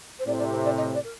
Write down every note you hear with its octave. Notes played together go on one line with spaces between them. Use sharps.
C5
A2 C3 D5
D5
C5
D5
D#5
D5
A#4